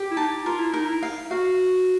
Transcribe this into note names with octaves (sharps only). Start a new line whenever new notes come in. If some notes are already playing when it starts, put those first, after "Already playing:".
Already playing: G4
E4
D#4 A5
F4 A#4
E4
D#4 A#4
E4
F5
F#4 F5